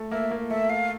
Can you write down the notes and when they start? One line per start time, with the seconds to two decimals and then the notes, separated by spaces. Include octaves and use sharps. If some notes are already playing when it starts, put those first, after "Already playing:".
Already playing: A3
0.11 A#3 E5
0.31 A#3
0.51 A3 E5
0.70 F5